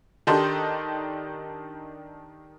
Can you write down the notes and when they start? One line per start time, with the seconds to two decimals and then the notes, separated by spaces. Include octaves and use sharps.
0.27 D#3 D4 D#4 G4 A4 C6